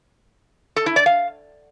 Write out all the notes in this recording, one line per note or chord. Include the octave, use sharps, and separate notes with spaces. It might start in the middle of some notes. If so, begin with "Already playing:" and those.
A4
E4
D5
F5